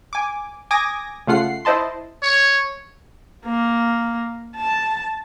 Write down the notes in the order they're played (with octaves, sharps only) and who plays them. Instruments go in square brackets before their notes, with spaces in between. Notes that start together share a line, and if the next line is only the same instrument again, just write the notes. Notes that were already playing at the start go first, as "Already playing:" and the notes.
[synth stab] G#5 D6
G#5 D6 D#6 G#6 A#6
C#3 A3 F4 F#5 C7
E4 C5 D#5 A5 C6
[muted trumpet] C#5
[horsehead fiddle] A#3
A5